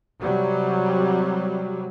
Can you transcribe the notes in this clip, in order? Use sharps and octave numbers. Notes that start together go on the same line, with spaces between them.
C3 F#3 G3